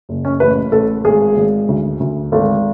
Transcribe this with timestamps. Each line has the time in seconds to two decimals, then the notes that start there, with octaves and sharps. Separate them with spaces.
0.09 F#1
0.25 C#4
0.40 A1 B4
0.72 A1 A4
1.05 G#1 G#4
1.37 G#1
1.68 D2
2.00 D2
2.32 G#1 A4